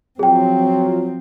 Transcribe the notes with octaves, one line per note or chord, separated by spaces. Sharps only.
F3 F#3 C4 F4 G#4 G5